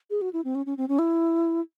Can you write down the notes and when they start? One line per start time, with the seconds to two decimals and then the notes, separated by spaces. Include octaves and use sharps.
0.10 G#4
0.21 F#4
0.33 E4
0.44 C4
0.55 C#4
0.66 C#4
0.77 C4
0.89 C#4
0.99 E4